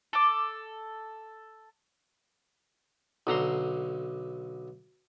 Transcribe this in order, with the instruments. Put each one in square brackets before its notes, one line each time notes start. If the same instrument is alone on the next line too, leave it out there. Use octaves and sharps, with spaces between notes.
[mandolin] A4 D6
[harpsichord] B1 D3 A#5 C6